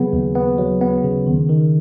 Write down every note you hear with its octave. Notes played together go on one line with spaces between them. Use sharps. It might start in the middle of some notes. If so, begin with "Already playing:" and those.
Already playing: C#3 F#3 B3 G#4
D#2
B3
F#3
B3
C#3
D#3
D#3